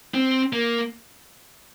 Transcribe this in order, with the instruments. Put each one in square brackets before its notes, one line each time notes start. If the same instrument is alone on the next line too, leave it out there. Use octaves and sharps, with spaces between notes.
[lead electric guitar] C4
A#3